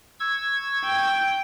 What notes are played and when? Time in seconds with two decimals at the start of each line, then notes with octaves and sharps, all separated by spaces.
0.20 C#6 E6 G#6
0.85 G5